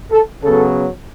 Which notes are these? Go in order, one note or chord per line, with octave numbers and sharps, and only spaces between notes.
A4
C#3 F#3 B3 A4